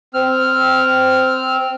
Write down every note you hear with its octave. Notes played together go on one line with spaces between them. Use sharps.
C4 F6